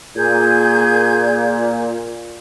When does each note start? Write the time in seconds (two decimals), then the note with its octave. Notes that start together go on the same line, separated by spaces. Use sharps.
0.16 A#2 G#4 G6 G#6